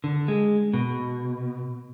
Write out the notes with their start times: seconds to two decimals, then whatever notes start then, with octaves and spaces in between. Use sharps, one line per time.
0.04 D3
0.28 G#3
0.73 B2